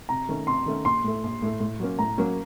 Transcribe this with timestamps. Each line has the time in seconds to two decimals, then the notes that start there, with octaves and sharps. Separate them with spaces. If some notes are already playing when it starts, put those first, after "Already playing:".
0.09 C3 A#5
0.29 D#3 A3 C#4
0.47 C3 C6
0.66 D#3 A3 C#4
0.85 A#1 C6
1.04 A2 A3
1.23 A#1
1.42 A2 A3
1.60 A2
1.80 F#3 A#3 C#4
1.99 A2 A#5
2.18 F#3 A#3 C#4